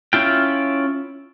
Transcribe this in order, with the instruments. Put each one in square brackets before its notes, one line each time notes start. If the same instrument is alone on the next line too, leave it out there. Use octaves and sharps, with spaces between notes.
[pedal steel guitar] C#4 E4 F4 G5